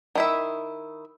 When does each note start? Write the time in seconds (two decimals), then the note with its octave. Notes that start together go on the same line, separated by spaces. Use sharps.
0.15 D#3 E4 E5